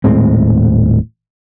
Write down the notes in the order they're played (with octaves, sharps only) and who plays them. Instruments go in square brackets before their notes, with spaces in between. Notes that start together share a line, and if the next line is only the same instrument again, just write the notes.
[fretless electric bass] D#1 A2 G#3 C4